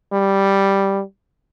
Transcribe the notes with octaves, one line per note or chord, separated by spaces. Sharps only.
G3